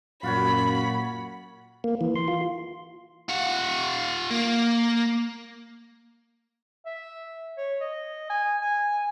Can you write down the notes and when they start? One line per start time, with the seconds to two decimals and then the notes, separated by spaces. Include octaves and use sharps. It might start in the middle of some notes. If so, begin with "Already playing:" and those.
0.23 F#2 A#2 F4 F#4 C#5 B5
1.84 A#3
2.01 E3
2.16 C6
2.28 F4
3.29 F4 F#5
4.30 A#3
6.86 E5
7.58 C#5
7.81 D#5
8.30 G#5
8.62 G#5